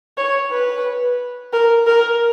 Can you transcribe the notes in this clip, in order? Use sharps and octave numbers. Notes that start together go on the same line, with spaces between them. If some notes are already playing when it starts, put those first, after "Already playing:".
C#5
B4
A#4
A#4